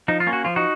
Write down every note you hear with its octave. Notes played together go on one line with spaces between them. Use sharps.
F3 D#4
F4
A#3 C#4
F#4
F3 F4
D#4 F#4